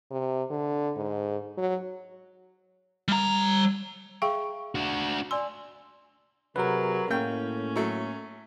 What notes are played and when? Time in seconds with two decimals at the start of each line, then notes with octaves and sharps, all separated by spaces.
0.11 C3
0.50 D3
0.96 G#2
1.58 F#3
3.08 G3 A#5
4.22 G#4 E5 F5 G5 C#6
4.75 D4 F#4
5.31 D5 G#5 C6 E6
6.56 C3 F#3 G#4 A#4 B4
7.11 A2 A#3 C#4 G5
7.76 F#3 A3